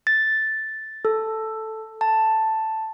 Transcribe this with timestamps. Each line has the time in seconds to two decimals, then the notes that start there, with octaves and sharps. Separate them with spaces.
0.07 A6
1.05 A4
2.01 A5